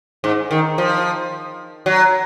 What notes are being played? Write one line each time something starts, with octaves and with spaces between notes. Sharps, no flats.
G#2
D#3
F3
F#3